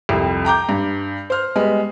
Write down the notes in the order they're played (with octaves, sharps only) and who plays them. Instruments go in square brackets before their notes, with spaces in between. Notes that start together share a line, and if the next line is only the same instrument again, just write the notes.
[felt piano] C2 F2
G5 A#5 D6 G6
G2
C5 F6
G3 G#3 B3